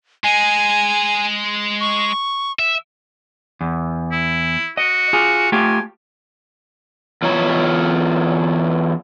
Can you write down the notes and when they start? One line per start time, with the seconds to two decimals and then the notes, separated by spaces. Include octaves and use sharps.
0.24 G#3 G#5
1.81 C#6
2.59 E5
3.61 E2
4.12 E4
4.77 F#4 D#5
5.13 F4 G#4
5.52 A3 F4 G4 G#5
7.22 E2 F4 C#5 A#5